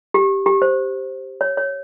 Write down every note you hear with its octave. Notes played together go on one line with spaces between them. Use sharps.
G4
G4
C5
C#5
C#5